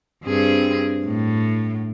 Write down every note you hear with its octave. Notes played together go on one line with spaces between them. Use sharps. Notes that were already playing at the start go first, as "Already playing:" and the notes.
G2 C4 G#4
A2